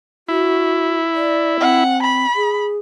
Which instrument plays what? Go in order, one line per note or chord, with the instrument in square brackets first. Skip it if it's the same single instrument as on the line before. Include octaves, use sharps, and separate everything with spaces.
[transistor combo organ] E4 [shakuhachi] F#4
[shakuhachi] D5
[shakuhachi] C4 [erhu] F#5
[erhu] B5
[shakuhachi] G#4